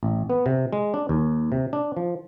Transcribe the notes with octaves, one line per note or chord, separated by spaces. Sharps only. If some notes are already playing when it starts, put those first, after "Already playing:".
A1
B3
C3
G#3
D4
D#2
C3
D4
F3